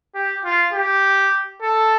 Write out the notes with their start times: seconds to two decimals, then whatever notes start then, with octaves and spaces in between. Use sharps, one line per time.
0.15 G4
0.45 F4
0.73 G4
1.62 A4